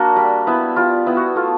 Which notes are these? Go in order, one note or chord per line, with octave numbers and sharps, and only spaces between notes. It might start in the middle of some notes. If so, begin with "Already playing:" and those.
Already playing: A#3 D4 F#4
G3
B3 E4
G3 F4
B3 E4
F#4
A3 F4